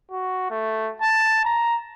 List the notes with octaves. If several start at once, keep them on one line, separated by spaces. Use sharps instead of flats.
F#4
A3
A5
A#5